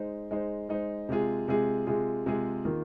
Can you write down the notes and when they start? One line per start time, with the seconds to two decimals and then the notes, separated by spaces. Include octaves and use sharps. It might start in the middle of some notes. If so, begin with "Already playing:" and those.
Already playing: G#3 D#4 C5
0.31 G#3 D#4 C5
0.69 G#3 D#4 C5
1.09 C3 G#3 F4 G#4
1.48 C3 G#3 F4 G#4
1.87 C3 G#3 F4 G#4
2.26 C3 G#3 F4 G#4
2.65 D#3 A#3 F4